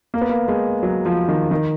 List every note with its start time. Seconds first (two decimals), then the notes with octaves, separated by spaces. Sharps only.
0.14 A#3
0.21 B3
0.30 A#3
0.48 G#3
0.83 F#3
1.06 F3
1.29 D#3
1.51 D#3